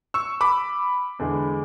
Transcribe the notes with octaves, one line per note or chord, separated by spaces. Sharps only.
C#6 E6
B5 D6
E2 D3 G#3